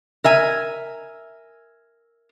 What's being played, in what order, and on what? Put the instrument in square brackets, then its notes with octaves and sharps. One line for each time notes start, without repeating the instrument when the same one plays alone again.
[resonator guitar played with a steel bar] A#4 E5 G#5